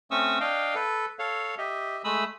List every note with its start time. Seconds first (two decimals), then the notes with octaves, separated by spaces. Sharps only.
0.11 A3 C4 C#4 C#6 D#6 E6
0.40 D4 D#5 F5 G5
0.75 A4 B4
1.19 A4 C#5 F5
1.58 G4 D#5 E5
2.04 G#3 A3 E5 B5 D#6 E6